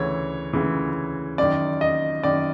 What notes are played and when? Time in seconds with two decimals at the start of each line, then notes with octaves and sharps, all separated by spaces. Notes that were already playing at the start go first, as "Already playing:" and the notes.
Already playing: D2 C#3 E3 C#5
0.53 D2 C#3 E3
1.38 F#2 D#3 D5
1.81 D#5
2.24 F#2 D#3 D5